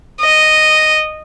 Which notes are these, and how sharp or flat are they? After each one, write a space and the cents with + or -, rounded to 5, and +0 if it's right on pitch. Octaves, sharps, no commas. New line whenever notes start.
D#5 -5